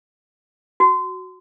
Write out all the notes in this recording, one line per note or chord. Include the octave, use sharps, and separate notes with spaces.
F#4